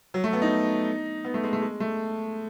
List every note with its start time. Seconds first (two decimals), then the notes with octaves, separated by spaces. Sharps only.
0.14 F#3
0.24 A3
0.33 B3
0.42 D#4
1.25 B3
1.34 A3
1.44 G#3
1.53 A3
1.62 G#3
1.80 A3